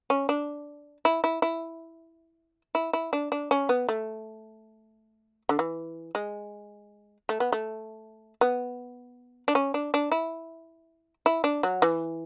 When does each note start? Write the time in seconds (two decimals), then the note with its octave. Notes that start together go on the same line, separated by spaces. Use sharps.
0.10 C#4
0.29 D4
1.05 E4
1.24 E4
1.42 E4
2.75 E4
2.93 E4
3.13 D4
3.32 D4
3.51 C#4
3.69 B3
3.89 A3
5.49 D3
5.59 E3
6.15 G#3
7.29 A3
7.40 B3
7.52 A3
8.41 B3
9.48 D4
9.55 C#4
9.74 D4
9.94 D4
10.12 E4
11.26 E4
11.44 D4
11.63 F#3
11.82 E3